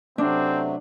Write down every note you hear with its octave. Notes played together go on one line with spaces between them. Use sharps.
C3 F#3 A3 C4 D4